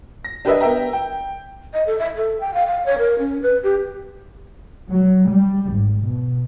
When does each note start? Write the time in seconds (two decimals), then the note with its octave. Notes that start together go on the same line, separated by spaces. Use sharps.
0.25 A#6
0.45 D4 G4 A#4 B4 D#5 E5
0.61 B3 A#4 E5 G5 A#5
0.93 G5
1.73 D#5
1.87 A4
1.99 E5
2.16 A4
2.40 G5
2.54 F5
2.67 F5
2.86 C#5
2.98 A#4
3.19 C#4
3.42 B4
3.63 G4
4.89 F#3
5.28 G3
5.71 G#1
6.03 B2